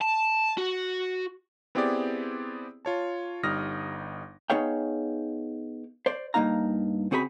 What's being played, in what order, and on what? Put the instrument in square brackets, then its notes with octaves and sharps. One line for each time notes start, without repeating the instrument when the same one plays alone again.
[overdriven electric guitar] A5
F#4
[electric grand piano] B3 C4 E4 G4 G#4 D5
F4 C#5 A5
G1 G3 D#4 D#6 F6 A#6
[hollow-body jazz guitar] B3 D#4 G#4 C#5 F5 G5
C5 D5
G2 F#3 A#3 D#4 F5 A#5
C#3 C4 F#4 G#4 C5 B5